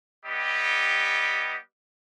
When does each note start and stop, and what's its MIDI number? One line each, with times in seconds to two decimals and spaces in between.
0.25 1.56 55
0.25 1.56 59
0.25 1.56 67
0.25 1.56 75